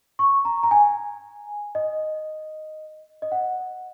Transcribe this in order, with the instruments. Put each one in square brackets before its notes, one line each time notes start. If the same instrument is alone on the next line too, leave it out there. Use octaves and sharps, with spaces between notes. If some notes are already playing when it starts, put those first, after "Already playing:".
[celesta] C#6
A#5
A#5
G#5
D#5
D#5
F#5